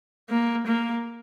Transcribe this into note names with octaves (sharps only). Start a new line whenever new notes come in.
A#3
A#3